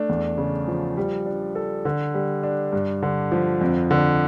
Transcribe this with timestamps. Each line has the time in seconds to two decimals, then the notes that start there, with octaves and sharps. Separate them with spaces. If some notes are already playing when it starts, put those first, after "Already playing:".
Already playing: A3 D4
0.09 E2
0.38 C#3
0.68 F3
0.97 G3
1.26 D4
1.55 A4
1.85 D3
2.14 G3
2.43 D4
2.73 G2
3.03 D3
3.32 F3
3.61 F2
3.91 D3